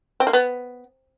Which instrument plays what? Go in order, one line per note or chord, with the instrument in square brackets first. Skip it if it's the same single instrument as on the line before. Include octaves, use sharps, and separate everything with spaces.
[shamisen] C4
A#3
B3